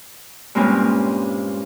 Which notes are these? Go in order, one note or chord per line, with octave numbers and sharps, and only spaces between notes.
G2 A#2 G#3 C4 C#4